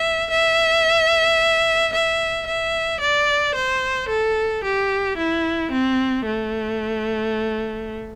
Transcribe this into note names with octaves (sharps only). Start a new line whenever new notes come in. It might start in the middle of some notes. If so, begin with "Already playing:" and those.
Already playing: E5
E5
E5
E5
D5
C5
A4
G4
E4
C4
A3